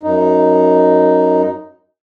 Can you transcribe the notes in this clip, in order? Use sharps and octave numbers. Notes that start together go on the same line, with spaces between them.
F#2 D#4